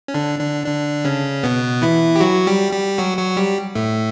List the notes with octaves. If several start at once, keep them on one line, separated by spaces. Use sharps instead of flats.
C#4
D3 D4
D3 D4
D3 D4
C#3 C#4
B2 B3
E3 E4
G4
F#3 F#4
G3 G4
G3 G4
F#3 F#4
F#3 F#4
G3 G4
A2 A3